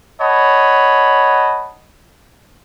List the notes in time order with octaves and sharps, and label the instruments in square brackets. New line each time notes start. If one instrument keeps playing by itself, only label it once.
[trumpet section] C#5 D#5 F#5 A5 B5